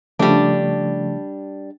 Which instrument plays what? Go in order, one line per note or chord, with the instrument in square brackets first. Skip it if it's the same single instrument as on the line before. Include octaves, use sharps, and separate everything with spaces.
[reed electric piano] C#3 F3 A3 [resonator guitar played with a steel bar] G3 D4